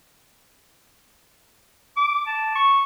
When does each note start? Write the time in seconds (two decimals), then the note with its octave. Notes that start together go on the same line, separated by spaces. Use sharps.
1.97 D6
2.27 A5
2.55 C#6